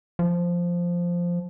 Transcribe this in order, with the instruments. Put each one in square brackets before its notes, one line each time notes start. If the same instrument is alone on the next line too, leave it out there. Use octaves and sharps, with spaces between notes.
[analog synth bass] F3